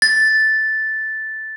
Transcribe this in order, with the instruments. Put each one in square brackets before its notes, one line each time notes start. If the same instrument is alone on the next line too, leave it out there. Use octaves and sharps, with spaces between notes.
[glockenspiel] A6